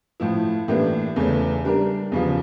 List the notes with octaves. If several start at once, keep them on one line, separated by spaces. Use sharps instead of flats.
A2 F3 A3 E4
A2 E3 A#3 D4 G4
E2 C#3 E3 A3 C#4
G3 D4 G4 A#4
E2 C#3 F3